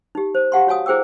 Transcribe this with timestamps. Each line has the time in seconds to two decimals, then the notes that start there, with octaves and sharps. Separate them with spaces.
0.15 D#4 G4
0.35 C5
0.52 G4 F5 F#5 A5 C6
0.67 F#4 C#5 F5 G#5 D#6
0.86 E4 G#4 C5 G5 D6 E6